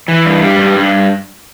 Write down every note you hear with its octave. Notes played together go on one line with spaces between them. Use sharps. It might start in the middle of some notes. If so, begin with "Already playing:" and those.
E3
G2
G3
G2
G2